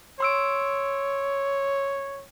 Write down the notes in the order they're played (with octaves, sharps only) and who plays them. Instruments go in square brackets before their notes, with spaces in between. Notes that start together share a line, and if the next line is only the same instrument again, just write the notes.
[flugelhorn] C#5 [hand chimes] C6 E6 D7